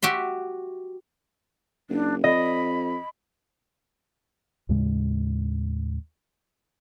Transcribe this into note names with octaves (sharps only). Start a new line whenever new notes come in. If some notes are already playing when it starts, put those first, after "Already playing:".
F#4 G4 E5 C6
F#1 D4
F2 D#5 B5
D#2 A2 C#3 G#3